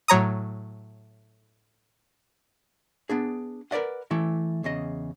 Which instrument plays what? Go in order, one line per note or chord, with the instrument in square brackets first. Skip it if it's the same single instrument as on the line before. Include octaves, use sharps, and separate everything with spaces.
[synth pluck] A2 F#3 C#5 A#5 D#6
[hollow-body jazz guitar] B3 D4 G#4
A#4 B4 D5 D#5 F#5
E3 A3 E4
E2 C#3 D#5